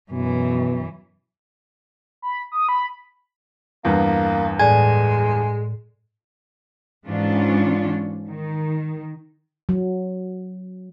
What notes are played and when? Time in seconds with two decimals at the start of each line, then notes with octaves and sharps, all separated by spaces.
0.12 F#2 B2 E3
2.22 B5
2.52 D#6
2.69 B5
3.85 E2 G2 A#3
4.59 A2 G#3 D5 G#5 G#6
7.07 G#2 E3 C#4 D4 F4
8.28 D#3
9.69 F#3